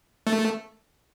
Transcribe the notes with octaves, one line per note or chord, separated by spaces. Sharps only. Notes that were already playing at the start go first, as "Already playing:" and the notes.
A3